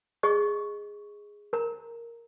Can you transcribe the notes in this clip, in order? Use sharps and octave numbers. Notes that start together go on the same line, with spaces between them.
G#4 D#5 C#6
A#4 A#5